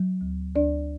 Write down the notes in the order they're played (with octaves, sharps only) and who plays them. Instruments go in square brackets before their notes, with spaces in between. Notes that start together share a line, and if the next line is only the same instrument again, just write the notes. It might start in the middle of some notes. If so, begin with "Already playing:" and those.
Already playing: [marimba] F#3
D2
D2 D4 D5